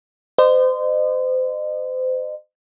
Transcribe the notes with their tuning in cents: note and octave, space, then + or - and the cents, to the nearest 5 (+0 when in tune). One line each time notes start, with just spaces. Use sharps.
C5 -30 D#5 -40